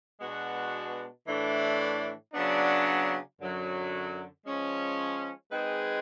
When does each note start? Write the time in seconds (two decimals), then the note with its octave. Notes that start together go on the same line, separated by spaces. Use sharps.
0.21 B2 G#3 B3 D4 F#4
1.27 A2 E3 A3 D4
2.33 C#3 F#3 B3 D4
3.39 F#2 D3 F#3
4.45 F3 G#3 C#4
5.51 G#3 C4 D#4 G#4 B4